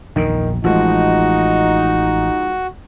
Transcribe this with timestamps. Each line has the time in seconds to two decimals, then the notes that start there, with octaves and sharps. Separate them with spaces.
0.16 A#1 E2 A#2 D#3
0.64 A1 F3 G#3 D#4 F#4